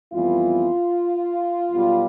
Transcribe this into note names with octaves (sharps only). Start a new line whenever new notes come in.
F2 E3 G3 B3 F4
B1 B2 G3 B3